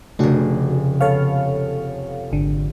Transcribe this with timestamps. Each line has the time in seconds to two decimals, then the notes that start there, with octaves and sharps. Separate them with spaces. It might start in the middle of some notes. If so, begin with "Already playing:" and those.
0.19 F1 C#3 A3 D4 F#4
1.01 B3 A4 C#5 F5
2.32 G#1 D3